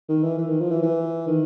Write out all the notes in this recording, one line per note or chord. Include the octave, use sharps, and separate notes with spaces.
D#3
E3
E3
D#3
F3
E3
E3
D#3